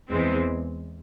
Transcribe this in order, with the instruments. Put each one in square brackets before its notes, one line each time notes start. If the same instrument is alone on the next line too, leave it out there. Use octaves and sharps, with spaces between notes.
[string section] E2 E3 G#3 C4